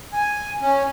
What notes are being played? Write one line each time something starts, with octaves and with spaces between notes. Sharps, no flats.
G#5
C#4